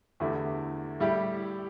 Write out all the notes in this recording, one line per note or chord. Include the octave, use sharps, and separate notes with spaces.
E2 D3 A3 E4 G4
A2 G3 E4 G4